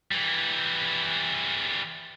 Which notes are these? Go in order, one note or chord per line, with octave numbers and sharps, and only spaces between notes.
E3 G3